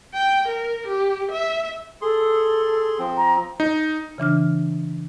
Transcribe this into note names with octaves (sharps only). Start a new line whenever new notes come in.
G5
A#4
G4
E5
G#4 A4 C6
F3 C4
A#5
D#4
C#3 E3 D4 F6